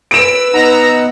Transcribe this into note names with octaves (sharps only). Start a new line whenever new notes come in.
B4 E6 D7 E7
B3 D#4 F#5 A#5